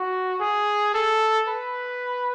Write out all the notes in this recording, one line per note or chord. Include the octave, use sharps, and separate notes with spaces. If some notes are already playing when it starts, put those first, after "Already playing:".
Already playing: F#4
G#4
A4
B4